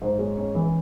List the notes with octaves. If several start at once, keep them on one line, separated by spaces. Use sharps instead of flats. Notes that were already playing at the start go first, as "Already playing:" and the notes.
G#2 C5
G#3 C#5
C#4 C#5
E3